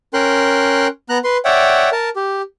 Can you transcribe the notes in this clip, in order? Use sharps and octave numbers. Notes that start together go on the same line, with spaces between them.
C#4 A#4 G5 C6 F#6
B3 A#5 F#6
B4 C6
C#5 D5 E5 F#5 G5
A#4 A5
G4